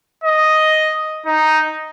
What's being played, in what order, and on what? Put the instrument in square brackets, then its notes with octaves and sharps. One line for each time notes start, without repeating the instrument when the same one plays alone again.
[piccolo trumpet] D#5
D#4